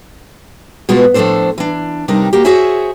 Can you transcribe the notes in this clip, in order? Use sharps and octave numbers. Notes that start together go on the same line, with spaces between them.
B2 G#3 B3 F4 F#4
A2 F3 A3 D4 A4 C5
E3 D4
C3 G3 D4 D#4 A#4
A#3 F#4 G4
F#4 G#4 C5 C#5 E5 G#5